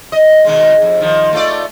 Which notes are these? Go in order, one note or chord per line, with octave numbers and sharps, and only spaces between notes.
D#5
B2 D#3 G#3
F2
D#3 F3
A3 F4 D5